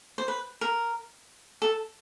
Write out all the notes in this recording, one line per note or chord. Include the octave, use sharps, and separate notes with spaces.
C5
B4
A#4
A4